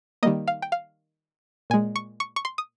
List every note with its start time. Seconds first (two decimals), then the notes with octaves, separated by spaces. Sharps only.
0.23 D#3 G3 A#3 D#5
0.48 F5
0.62 G5
0.72 F5
1.70 A#2 G#3 G#5
1.96 C#6
2.20 C#6
2.36 C#6
2.45 C6
2.58 D#6